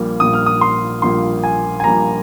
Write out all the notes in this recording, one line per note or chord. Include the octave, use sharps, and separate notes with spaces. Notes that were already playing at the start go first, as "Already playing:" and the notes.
Already playing: A#1 A#2 G3 A#3
A#1 A#2 G3 A#3 D#6
F6
D#6
C6
A#1 A#2 G3 A#3 C6
G#5
G#5
A#1 A#2 G3 A#3 A#5